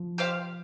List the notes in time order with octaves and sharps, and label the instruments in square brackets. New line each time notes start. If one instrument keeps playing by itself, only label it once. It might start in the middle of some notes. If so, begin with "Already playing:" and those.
Already playing: [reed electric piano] F3
[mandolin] G4 C5 F5